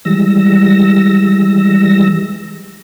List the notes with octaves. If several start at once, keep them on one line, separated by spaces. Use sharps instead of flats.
E3 G3 G#3 E6 A#6